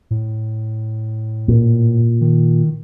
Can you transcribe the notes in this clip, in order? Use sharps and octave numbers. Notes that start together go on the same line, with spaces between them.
A2
A#2
D#3